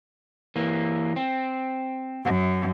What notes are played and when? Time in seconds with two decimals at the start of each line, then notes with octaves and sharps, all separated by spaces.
0.56 E3 A#3
1.16 C4
2.23 F#2